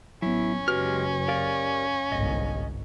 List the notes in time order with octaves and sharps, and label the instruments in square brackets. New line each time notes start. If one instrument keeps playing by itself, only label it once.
[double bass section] A1 [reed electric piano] F#3 B3 [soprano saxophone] C#4 [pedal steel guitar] E4
[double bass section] F#1 [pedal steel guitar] G#3 G4 F6 [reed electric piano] F#4 B4
[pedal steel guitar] G4 A#4 D5 [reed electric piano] F5
[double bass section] G1 C2 G#2 [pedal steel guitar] D#5